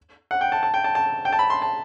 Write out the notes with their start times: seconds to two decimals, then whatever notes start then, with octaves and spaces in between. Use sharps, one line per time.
0.31 F#5
0.41 G5
0.52 A5
0.63 A5
0.74 G5
0.84 A5
0.95 A5
1.25 G5
1.32 A5
1.39 B5
1.50 C6
1.62 A5